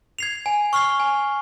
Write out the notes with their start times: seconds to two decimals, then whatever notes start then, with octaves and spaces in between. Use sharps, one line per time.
0.19 G#6 C7 F7
0.46 G#5
0.73 C#6 F6 C7 G7
1.00 G#5